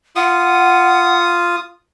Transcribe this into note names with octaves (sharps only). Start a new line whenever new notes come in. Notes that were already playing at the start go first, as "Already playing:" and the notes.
F4 F#5 D#6